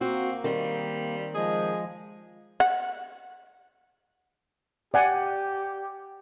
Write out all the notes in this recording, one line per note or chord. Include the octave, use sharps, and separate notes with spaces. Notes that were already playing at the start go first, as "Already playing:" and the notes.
A#3 C4 F#4
D#3 G3 C4
F3 G#3 G#4
F#5
G4 D5 F#5 G#5